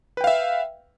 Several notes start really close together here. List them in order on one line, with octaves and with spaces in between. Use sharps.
B4 G5 F5 E5